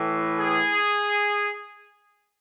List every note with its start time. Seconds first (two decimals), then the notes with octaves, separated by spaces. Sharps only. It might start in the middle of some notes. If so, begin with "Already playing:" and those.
Already playing: A2 E3
0.39 G#4